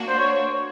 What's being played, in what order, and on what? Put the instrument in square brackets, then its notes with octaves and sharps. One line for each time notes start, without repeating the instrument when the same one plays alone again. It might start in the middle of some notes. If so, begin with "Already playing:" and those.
Already playing: [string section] A#3 D4 F#4
[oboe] C5
C#5